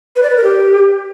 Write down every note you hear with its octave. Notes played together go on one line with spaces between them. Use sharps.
B4
D5
B4
A#4
G4